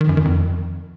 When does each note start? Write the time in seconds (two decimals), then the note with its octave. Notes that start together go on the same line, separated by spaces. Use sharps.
0.01 D#3
0.09 F#2
0.17 D#3
0.25 F2